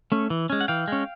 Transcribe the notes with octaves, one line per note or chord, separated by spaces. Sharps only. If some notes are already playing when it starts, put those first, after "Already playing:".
A3 C#4
E3
G#3 C#4
F#5
E3 F5 G5
G#3 C#4